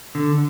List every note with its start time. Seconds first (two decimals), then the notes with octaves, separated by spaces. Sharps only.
0.15 D3